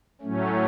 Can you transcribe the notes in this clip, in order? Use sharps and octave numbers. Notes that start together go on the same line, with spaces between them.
A2 F#3 A3 C#4